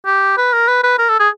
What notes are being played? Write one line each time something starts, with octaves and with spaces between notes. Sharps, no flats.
G4
B4
A#4
B4
B4
A#4
A4
G#4